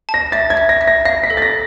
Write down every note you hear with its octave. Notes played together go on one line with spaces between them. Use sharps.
A5
A#6
E5 A6
G#6
E5
A#6
E5
A#6
F5 A#6
B6
A4
A6
A#6